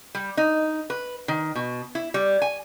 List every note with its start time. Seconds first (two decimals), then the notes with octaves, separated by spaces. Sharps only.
0.15 G3
0.37 D#4
0.90 B4
1.28 D#3
1.55 B2
1.95 E4
2.14 G3
2.42 G#5